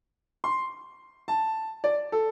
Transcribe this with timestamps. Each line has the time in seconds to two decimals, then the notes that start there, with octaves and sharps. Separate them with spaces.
0.44 C6
1.28 A5
1.84 D5
2.12 A4